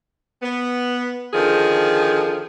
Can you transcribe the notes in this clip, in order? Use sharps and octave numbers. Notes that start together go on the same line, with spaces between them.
B3
D3 D#3 F3 G#4